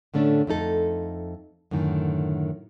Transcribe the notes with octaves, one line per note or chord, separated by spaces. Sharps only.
A2 D3 A3 C#4 D4
F2 A3 D#4 A4
F#2 A2 D3 D#3